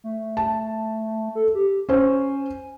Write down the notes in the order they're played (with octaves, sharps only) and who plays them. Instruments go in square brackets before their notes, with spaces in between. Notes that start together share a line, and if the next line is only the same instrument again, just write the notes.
[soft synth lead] A3
[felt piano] A5
[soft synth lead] A4
G4
[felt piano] C#4 C5 [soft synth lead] G#5